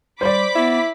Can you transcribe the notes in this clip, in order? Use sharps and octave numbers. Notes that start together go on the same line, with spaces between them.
G3 C5 D5 B5 D6 B6
B3 E4